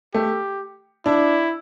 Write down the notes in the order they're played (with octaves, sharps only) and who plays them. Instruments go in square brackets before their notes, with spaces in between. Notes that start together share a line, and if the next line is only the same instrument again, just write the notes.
[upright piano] A3 [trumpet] G4
[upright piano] D4 [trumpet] E4